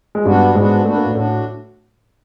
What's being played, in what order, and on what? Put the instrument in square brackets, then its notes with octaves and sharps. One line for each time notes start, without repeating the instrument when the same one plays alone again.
[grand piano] G#3
[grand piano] G2 G3 [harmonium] B3 D4 F#4
[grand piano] G#2 G#3 [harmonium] B3 D4 F#4
[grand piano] A3 [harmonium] B3 D4 F#4
[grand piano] A#3
A2 A3
[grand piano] A2 A3 [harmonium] D4 F#4